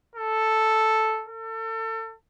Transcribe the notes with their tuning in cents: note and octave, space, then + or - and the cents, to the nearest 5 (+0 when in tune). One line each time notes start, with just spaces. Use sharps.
A4 +0
A4 +35